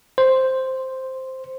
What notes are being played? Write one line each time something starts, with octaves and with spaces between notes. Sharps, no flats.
C5